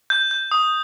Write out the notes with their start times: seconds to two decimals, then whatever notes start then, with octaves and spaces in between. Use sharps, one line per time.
0.10 G6
0.31 G6
0.51 D#6